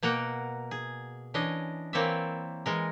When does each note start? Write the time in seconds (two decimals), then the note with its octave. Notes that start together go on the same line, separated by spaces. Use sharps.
0.03 B2 A#3 A#4 F#5 G5
0.71 G#4
1.34 E3 C#4 D4 D#5
1.93 E3 A#3 C4 C#5 D5 E5
2.66 E3 G#3 A#4